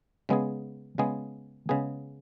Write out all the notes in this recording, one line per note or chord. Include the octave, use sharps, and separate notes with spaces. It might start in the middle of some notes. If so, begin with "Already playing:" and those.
C#3 G#3 B3 G#4
C#3 G#3 B3 G#4
C#3 G#3 B3 G#4